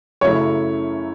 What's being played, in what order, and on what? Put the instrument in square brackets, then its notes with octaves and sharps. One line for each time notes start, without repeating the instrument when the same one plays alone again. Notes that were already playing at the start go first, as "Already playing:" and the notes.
[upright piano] F#2 C#3 F#3 A3 E4 [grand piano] C#5